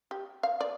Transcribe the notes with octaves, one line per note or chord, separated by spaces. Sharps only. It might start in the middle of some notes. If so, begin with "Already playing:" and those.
G4
F5
D5